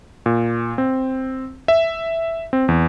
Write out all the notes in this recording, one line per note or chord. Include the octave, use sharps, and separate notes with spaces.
A#2
C4
E5
C4
E2